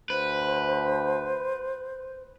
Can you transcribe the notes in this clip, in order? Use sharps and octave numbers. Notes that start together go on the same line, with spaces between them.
D2 B4 C5